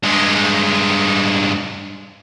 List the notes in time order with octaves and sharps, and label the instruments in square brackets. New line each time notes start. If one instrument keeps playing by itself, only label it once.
[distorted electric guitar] G2 G#3